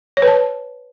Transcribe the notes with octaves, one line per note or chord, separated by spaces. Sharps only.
C#5
B4
A5